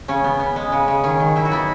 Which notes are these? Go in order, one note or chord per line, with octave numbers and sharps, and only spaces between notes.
C#3 C#4
B3
B3
G#3
C#3
C#3
D#3 C#4
D#3
F#3 E4
F#4
B3 E4